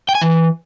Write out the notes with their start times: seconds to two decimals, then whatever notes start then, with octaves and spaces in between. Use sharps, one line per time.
0.09 G5
0.15 G#5
0.21 E3